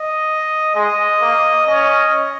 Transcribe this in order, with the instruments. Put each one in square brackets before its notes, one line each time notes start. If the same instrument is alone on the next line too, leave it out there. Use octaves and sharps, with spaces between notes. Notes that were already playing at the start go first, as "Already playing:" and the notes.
Already playing: [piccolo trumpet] D#5
[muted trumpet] G#3 [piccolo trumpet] D#5
[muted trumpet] A#3
[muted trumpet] C#4 [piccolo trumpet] D#5